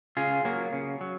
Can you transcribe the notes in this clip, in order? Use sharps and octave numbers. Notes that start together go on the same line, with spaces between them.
C#3 F4 G#4
F#3 A#3
C#3
F#3